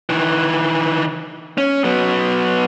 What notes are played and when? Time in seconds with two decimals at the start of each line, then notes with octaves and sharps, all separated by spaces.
0.10 D#3 E3
1.58 C#4
1.84 F#3 B3